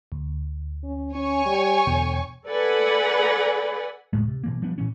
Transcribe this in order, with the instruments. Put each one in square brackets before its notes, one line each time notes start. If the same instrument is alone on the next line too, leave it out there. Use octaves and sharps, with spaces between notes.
[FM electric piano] D2
[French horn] C#4
[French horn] C#4 [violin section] C#5 G#5 C#6
[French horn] G3
[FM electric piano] E2 B2 G5 [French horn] D3
[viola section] A4 B4 D5 F#5 G#5 B5
[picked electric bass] E1 C#2 A2 G#3
C3
B2 E3 A#3
F3 G3 B3 D4
A#2 E3 C#4